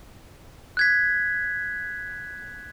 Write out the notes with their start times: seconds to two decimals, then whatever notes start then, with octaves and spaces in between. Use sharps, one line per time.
0.77 F#6 G#6 B6